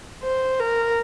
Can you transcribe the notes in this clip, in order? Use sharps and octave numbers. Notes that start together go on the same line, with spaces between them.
C5
A#4